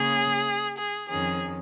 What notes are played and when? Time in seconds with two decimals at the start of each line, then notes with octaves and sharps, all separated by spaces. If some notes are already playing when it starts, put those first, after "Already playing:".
Already playing: C#3 A#3 C#4 G#4
0.78 G#4
1.09 F2 D#3 C#4 G#4